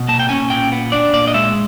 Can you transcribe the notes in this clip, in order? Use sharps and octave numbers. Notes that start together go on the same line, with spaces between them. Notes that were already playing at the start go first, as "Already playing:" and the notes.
Already playing: B2
A#3 A5
G5
C#4 G#5
A#2 G5
B3
D4 D5
A#2 D5
D#5
G#3 E5